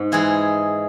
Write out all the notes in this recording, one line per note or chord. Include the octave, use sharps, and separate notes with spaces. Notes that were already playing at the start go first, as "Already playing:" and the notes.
Already playing: G#2
E3 G#3 G#4